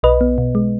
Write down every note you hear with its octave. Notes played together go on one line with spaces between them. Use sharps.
B1 B4 D#5
B3
B2
G#3